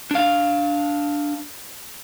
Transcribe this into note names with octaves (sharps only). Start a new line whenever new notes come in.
D4 F5